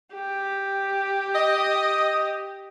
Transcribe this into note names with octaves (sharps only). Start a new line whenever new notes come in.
G4
D#5